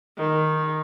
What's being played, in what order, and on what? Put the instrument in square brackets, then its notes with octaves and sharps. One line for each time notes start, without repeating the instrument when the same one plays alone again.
[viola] D#3